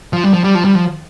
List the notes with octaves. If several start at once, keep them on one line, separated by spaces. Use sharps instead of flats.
F3
G3
F3
G3
F3
G3
F3